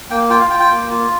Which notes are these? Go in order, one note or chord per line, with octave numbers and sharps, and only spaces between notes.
A#3 G5
F4 G5
F5
F4 G5
G5
A#3
F4